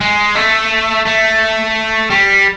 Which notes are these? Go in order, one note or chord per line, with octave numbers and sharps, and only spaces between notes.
G#3
A3
A3
G3